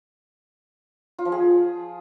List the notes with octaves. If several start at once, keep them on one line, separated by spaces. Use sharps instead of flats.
F4
F3
G#4